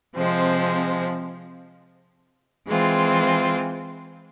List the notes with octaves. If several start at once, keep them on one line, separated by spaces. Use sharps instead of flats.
C3 F3 G#3 C4
E3 G#3 C4 F4